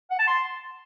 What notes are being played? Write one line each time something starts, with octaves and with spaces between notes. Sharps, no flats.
F#5
A5
C6